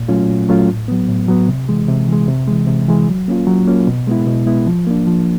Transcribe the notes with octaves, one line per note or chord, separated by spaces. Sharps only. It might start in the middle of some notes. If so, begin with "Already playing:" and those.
Already playing: A#2
F#3 A3 C#4 F4
A#2
F#3 A3 C#4 F4
A2
F#3 B3
A2
F#3 B3
C3
E3 G#3
C3
E3 G#3
C3
E3 G#3
C3
E3 G#3
F#3
A#3 C#4 F4
F#3
A#3 C#4 F4
B2
G#3 B3 E4
B2
G#3 B3 E4
F3
A#3 D4
F3